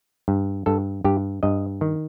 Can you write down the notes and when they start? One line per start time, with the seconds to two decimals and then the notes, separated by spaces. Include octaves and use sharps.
0.28 G2
0.66 G2 A4
1.04 G2 G4
1.43 G2 D#5
1.81 D#3